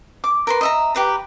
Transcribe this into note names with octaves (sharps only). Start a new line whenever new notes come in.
D6
A#4 B4 C6
D#5 E5 A#5
G4 B4 A#5